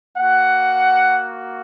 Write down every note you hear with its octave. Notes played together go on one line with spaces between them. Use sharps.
A#3 F#4 F#5